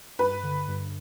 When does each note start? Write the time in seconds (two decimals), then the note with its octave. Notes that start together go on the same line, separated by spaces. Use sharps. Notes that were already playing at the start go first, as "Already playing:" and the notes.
0.19 G2 B4
0.43 D3
0.68 G2